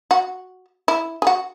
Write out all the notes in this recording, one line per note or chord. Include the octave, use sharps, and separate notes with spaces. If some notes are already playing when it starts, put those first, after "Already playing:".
F#4
E4
G#4
F#4